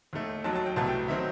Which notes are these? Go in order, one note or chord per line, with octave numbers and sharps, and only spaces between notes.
D#2 D#3 A3
D#2 D#3 F#3 A5
A5
G5
C2 B2 A3 A5
G5
D#3 F#3 C4 E5